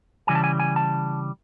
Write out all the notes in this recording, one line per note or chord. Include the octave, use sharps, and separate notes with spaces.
C#3 E3 G3 G#5
A5
G#5
G#5
A5